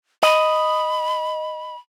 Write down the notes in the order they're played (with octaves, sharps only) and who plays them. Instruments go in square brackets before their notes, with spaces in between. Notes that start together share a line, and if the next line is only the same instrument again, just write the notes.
[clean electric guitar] D#5 [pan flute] B5